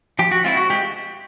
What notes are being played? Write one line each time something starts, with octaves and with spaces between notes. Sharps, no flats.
F3 G4
F#4
G#3 C4 E4 F4
F#4
G#3 G4